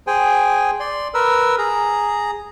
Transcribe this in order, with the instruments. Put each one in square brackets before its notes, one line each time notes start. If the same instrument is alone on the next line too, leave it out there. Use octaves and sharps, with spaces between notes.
[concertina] G#4 C5 G5 G#5
D5 C6
A#4 B4 E6
G#4 A#5